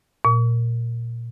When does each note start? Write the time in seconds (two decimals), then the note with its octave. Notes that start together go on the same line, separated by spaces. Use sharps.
0.25 A#2